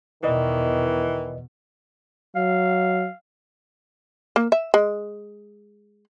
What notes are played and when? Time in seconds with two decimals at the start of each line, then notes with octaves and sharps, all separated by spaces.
0.23 E2 B2 D#3 E3 B4 D5 D#5
2.36 F#3 F5
4.36 A#3
4.52 E5
4.74 G#3